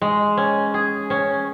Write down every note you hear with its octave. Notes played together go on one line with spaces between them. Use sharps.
G#3
C#4
G#4
C#4